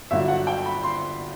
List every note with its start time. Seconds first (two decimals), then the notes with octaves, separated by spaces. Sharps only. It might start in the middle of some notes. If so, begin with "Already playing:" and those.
0.11 G1 G2 D3 F#3 E5
0.28 F#5
0.47 G5
0.66 B5
0.83 C6